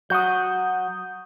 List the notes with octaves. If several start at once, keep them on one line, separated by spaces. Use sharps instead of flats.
F#3 F#4 D#6 G6